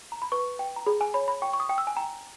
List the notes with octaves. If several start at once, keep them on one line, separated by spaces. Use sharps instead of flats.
A#5
B5
B4 C#6
G5
A#5
G#4 B5
G#5
C#5 B5
B5
G5 C#6
C#6
D#6
G5
E6
G#5
G5 A#5